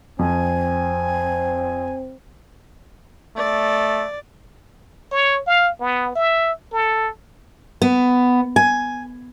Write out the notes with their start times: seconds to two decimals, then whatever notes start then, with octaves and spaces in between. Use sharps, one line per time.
0.19 F2 C4 G#5
3.37 A3 D5
5.12 C#5
5.47 F5
5.80 B3
6.15 E5
6.73 A4
7.82 B3
8.56 G#5